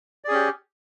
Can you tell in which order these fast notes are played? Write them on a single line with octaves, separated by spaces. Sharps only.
D5 G#4 C#4 G4